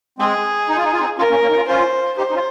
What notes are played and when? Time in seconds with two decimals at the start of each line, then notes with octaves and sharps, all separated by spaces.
0.19 G#3 C4 G#4
0.69 D#4
0.77 F4
0.84 D#4
0.92 F4
1.00 C4 D#4
1.18 C#4 F4 A#4
1.30 A#3 C#4
1.42 A#3 C#4
1.50 D#4
1.55 C#4 F4
1.67 C#4 F4 C5
2.17 D#4 G4 C5
2.30 D#4
2.33 C#4 F4